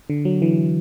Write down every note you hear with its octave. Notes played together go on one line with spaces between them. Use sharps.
D3
F#3
E3